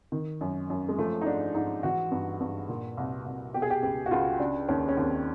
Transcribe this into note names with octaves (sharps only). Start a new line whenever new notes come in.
D#3
F#2
F#2
G#3
F3 A3
D#4
G#2 D4
G#2 D#4
E3 F#4
G2
G2
A#2
C2
C2
B2 G4
G#4
G4
C#2 G4
F#4
C#2 F4
C#3 D4
D#2 C#4
C#4
D#2 C4